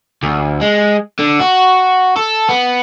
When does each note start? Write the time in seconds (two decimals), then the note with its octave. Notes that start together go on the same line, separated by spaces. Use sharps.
0.23 D2
0.61 G#3
1.19 D3
1.41 F#4
2.17 A4
2.49 B3